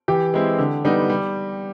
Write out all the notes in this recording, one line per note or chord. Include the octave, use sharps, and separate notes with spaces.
E3 G4
G#3 C4 E4
D3
G3 B3 D#4
G3